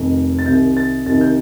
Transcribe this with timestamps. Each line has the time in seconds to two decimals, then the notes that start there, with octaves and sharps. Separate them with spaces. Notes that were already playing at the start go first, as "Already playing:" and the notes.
Already playing: F1 F2 D#3
0.39 A6
0.46 C2 C3 D#3 G6
0.77 A6
1.06 C2 C3 D#3 A6
1.21 G6